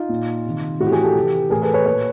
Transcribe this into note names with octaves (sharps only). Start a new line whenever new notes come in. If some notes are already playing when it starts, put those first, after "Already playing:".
Already playing: D#4 F4
A#2
C3 D#3
A2 E3 E4 F#4 G4
F#4 G#4
G4 A4
C3 E3
A2 E3 G#4 A#4
A4 B4
B4 C#5
A#2 B4 C#5